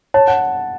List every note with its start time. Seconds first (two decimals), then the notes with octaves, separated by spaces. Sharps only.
0.14 C#5 A5
0.28 F#5